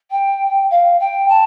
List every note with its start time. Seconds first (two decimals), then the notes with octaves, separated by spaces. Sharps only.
0.11 G5
0.70 F5
0.99 G5
1.28 A5